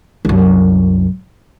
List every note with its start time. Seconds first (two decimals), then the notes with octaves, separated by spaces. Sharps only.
0.25 C2 F#2